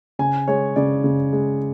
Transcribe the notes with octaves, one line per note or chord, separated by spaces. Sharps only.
C#3 G#5
G#3 C#5
C#3 D5
C#3
G#3